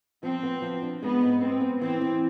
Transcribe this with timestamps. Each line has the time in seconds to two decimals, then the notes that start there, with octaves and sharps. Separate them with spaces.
0.23 F3 C4
0.43 B3
0.62 F3
0.82 D4
1.02 G#3 B3
1.21 G#2
1.41 B3 C4
1.61 B3
1.81 E3 C4
2.01 E3